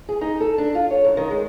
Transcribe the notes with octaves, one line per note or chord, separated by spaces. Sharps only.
G#4
D#4
A4
D4
F4
C#5
F#2
D#3
G#3